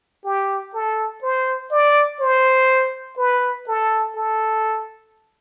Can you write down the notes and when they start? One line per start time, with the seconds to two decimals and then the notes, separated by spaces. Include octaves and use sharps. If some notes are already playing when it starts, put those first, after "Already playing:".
0.25 G4
0.74 A4
1.23 C5
1.72 D5
2.20 C5
3.18 B4
3.68 A4
4.16 A4